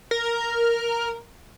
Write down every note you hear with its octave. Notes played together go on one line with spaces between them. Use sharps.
A#4